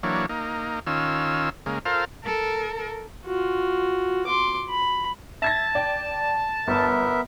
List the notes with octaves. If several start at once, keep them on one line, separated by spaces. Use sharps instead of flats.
E3 F#3 A#3 D4 C#5
A#3 D#4
D#3 C#4 F4 E6
C#3 G#3 A#3
F4 A4 A#4 C5 F5
A4 A#4
F4 F#4
C6 D6
B5
E5 A5 G#6 A#6
D5 G5
G1 B3 A#4 E5